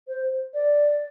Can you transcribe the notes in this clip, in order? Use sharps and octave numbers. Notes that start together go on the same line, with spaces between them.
C5
D5